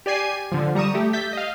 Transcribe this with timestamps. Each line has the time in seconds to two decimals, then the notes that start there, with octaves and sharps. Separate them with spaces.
0.06 G4 D5 G#5 C7 D#7
0.52 D3 F3
0.75 G3 A#5 C#6 D#6 E7
0.94 A3 G4
1.13 E5 G6 A6 B6
1.33 D#5 F5